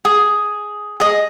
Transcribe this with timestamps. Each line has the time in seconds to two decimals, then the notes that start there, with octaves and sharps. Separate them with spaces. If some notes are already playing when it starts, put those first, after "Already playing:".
0.05 G#4
1.00 G#4 D#5